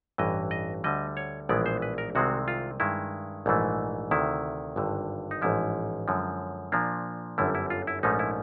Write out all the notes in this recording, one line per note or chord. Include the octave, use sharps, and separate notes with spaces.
A1 G2 E3 D#5
D#5
D2 D3 G3 D#5
C#5
A#1 A2 E3 G#3 B3 D5
C5
B4
A#4
C2 C3 D#3 G#3 C4 F#4
F4
G2 D#3 G#3 E4
A#1 G#2 E3 A3
D2 C3 D#3 E4
G#1 G2 D3
D#4
A1 G#2 F3 E4
F#2 D3 F3 G#3
A#2 F3 A#3 D4
G1 F#2 D3 G3 E4
E4
F4
E4
A#1 G#2 F3 A3 C#4 D#4
E4